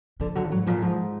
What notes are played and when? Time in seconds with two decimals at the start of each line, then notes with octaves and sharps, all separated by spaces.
0.20 D3 F3
0.35 D3 F#3
0.51 G#2 F#3
0.67 A#2 F3
0.82 G#2 F3